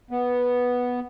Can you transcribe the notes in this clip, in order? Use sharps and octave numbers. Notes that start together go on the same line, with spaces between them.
B3